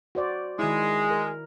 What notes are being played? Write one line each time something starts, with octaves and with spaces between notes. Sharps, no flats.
F#4 C5 D5
D#3 G#3 E4
A#4